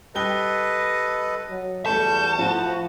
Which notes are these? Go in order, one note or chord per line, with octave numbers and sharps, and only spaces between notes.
G3 A4 B4 D#5 G5 G7
F#3
E2 G3 A3 A4 A5 C#6 G6
A2 F3 F#4